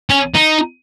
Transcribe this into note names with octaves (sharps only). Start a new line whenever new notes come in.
C#4
D#4